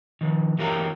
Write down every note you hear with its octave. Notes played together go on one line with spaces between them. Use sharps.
D#3 F3
E3 F#3 G4 A#4 G5 A#5